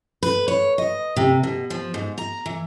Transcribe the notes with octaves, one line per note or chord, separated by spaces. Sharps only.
B4
C#5
D#5
C3
B2
F3
G#2
A#5
E3